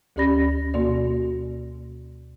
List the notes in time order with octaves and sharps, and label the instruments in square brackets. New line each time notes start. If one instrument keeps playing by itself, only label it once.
[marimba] D2 C#4 G4 D5 B5 A#6
B2 A#3 F#4 D5